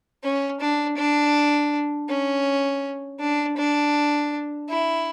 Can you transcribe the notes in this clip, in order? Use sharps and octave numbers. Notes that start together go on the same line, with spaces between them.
C#4
D4
D4
C#4
D4
D4
E4